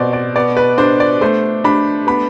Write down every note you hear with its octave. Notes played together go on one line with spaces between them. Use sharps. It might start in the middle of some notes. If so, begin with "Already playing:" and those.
Already playing: B2 C4 C5 D5
D5
B3 D5
B4
D4 C5
D5
A3 C5
D4 B5
B3 B5